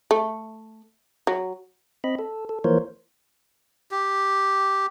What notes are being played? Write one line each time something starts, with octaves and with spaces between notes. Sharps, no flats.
A3
F#3
C4 D#5 B5
A4
A4
E3 F3 A#3 A#4 C5 C#5
G4